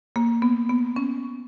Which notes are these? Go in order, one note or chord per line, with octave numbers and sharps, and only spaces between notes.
A#3
B3
B3
C#4